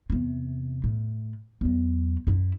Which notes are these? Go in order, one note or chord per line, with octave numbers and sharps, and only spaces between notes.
E2 C3
A2
E2 F#3
F#2 E4